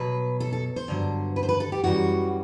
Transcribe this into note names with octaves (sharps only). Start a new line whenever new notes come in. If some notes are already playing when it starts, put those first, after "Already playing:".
Already playing: B2 F#3 B4
A4
A4
C5
G2 D3 F#3
B4
C5
B4
A4
G4
F#2 E3 G3 F#4